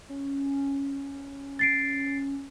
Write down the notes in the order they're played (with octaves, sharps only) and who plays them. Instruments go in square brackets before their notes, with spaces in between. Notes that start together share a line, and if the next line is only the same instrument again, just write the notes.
[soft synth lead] C#4
[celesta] A6 C7 D7